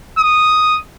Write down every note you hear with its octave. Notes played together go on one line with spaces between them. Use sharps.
D#6